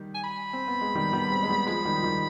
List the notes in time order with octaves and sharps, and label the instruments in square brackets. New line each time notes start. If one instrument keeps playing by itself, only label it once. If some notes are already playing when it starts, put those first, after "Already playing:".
Already playing: [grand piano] D#3 G3
[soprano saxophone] G#5
B5
[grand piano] C4
B3
G#3
D#3 G3
G3 B3
G#3 C4
G#3
G3 B3
[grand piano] F3 G#3 [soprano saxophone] B5
[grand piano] D#3 G3
F3
D#3 G3